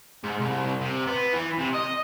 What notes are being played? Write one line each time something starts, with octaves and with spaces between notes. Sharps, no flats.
G#2
C2
C3
B3
E3
C3
D#5